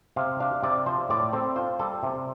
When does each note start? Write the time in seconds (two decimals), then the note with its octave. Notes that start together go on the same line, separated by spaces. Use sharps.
0.16 C3 F5
0.40 D4 F5
0.63 C3 D5
0.86 F3 C5
1.09 A2 D5
1.33 C4 A4
1.56 F4 C5
1.79 G3 A4
2.03 C3